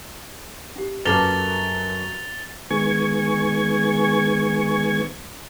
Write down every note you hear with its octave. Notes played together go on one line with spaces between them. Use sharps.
C#4 G4
F#2 A#3 A4 B4 A6 F7 G7
D#3 G#3 B3 G#5 C#6 G#6